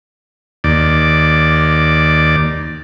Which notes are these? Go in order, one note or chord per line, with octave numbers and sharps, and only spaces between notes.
D#2 D5